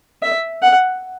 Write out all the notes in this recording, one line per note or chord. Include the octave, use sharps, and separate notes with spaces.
E5
F#5